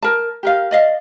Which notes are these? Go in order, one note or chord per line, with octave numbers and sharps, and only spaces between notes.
A#4 A5
G4 A#4 F5
D5 D#5 F5